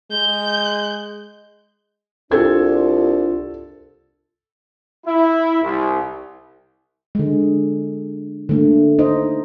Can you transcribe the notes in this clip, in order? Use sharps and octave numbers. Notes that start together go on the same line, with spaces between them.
G#3 G6
C2 D4 F4 A4 G#6
E4
C2
D3 G#3
D3 A3 A#3
D#4 C5 D#5